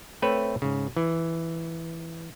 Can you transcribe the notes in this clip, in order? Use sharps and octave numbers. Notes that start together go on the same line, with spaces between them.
A3 C4 B4 C#5 E5
G#2 C#3
E3